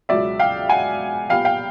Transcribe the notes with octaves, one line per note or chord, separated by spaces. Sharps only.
C#2 B2 F#3 B3 D5 E5
F5 G5
F#5 G#5
A#2 G3 B3 F5 G5
F5 G5